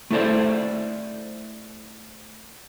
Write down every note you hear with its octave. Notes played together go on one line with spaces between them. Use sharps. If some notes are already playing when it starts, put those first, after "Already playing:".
A3 E4 A4 C5 D5